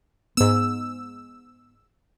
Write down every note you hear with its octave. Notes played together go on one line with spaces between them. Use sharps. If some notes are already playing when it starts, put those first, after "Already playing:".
G#2 B3 E6